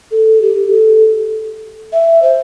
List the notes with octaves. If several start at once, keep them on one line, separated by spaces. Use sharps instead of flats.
A4
G4
A4
E5
C5